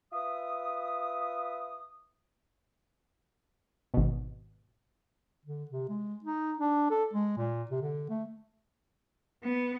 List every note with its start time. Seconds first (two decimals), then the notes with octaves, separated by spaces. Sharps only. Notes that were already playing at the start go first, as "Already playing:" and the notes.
0.13 F4 B4 E5 D#6
3.94 G#1 B2
5.45 D3
5.71 C3
5.89 G#3
6.24 D#4
6.59 D4
6.91 A4
7.13 G#3
7.37 A#2
7.71 C3
7.82 D3
8.10 A3
9.44 B3